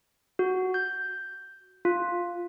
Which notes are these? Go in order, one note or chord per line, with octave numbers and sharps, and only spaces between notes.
F#4
G6
F4